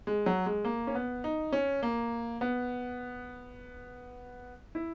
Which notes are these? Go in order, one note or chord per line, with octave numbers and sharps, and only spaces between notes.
G#3
F#3
G#3
A#3
C#4
B3
D#4
C#4
A#3
B3
E4